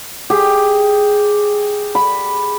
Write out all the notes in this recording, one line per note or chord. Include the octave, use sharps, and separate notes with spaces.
G4 G#4
B5